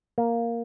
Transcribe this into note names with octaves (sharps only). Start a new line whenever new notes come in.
A#3